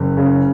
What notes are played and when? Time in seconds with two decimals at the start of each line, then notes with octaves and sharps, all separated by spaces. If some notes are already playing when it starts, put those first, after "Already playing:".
Already playing: F#1
0.17 C#3